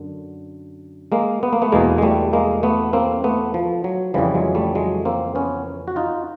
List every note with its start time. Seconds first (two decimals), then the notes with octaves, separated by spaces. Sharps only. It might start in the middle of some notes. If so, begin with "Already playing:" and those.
Already playing: F#2 D3
1.12 G#3 A#3
1.43 B3
1.53 A#3
1.62 A3 B3
1.72 E2 B2 G#3 A#3
1.98 G#3
2.02 G3 A3
2.33 G#3 A#3
2.63 A3 B3
2.93 A#3 C4
3.24 A3 B3
3.54 F3
3.84 F#3
4.14 F2 C#3 E3 F3 G3
4.35 F#3 G#3
4.55 G3 A3
4.75 F#3 G#3
5.05 A#3 C4
5.35 B3 C#4
5.88 F#4
5.96 D#4 F4